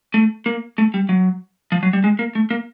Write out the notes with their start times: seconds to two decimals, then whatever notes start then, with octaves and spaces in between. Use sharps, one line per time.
0.14 A3
0.46 A#3
0.78 A3
0.94 G3
1.09 F#3
1.72 F3
1.83 F#3
1.93 G3
2.04 G#3
2.19 A#3
2.35 A3
2.50 A#3